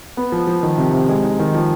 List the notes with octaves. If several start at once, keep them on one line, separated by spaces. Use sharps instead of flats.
B3
F3
F3
D#3
C3
C3
G#3
D#4
D#3
F3